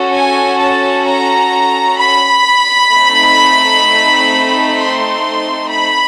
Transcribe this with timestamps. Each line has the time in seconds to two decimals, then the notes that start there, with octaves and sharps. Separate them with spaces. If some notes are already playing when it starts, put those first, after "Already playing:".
Already playing: C#4 F#4 A4
0.13 G#5
0.59 A5
1.06 A#5
1.98 B5
2.91 A3 C4 D#4
4.76 C6
5.69 B5